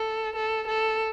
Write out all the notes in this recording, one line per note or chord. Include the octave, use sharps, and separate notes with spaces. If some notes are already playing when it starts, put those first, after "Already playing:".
Already playing: A4
A4
A4